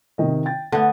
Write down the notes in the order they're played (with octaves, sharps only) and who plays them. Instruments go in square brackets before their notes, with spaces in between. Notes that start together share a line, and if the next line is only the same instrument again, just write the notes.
[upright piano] C3 D#3 D#5
G5 A6
[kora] D3 B3 [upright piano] A3